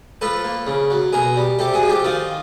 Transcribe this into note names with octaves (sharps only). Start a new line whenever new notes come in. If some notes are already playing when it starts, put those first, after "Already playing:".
F3 A4 B4
A#3
C#3
F#3
B2 G#4 A#4
G3
C3 G4 A4
F#4 G#4
F3
G4 A4
D#3 D#4 F4